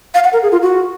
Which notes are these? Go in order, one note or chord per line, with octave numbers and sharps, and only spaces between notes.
F5
F#5
A#4
G#4
F4
F#4